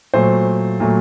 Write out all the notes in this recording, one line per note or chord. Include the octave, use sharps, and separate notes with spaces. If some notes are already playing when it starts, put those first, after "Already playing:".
A#2 F#3 A3 C5
A#2 F#3 A3